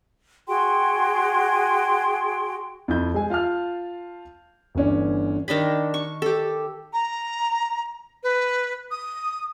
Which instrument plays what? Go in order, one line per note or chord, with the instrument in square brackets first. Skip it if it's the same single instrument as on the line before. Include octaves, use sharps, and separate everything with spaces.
[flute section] F#4 G#4 G5 C6
[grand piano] F2 E4 G6
G#3 G#4 G#5
F4 F5 A5 F6
G1 E3 C#4 D4
[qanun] D#3 D4 D#5 B5
C#6
G4 A4
[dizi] A#5
B4
D#6